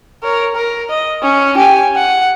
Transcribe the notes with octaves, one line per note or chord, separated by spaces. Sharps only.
A#4 C#5
A#4
D#5
C#4
G4 G#5
F#5